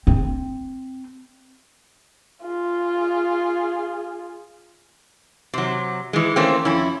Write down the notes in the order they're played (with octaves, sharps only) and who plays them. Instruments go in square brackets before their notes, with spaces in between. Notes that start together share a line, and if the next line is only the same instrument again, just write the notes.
[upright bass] C4
[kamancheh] F4 G#4
[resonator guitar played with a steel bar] C3 F#3
E3 G#3
E3 A3 A#3 C4 C#4
F2 C#4 E4